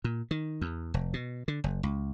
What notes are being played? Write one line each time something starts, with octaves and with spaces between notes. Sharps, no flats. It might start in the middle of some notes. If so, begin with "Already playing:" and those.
A#2
D#3
E2
F1
B2
D3
F#1
C#2